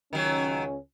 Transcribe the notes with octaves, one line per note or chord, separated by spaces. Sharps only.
C#2 D#3 F#3 C#4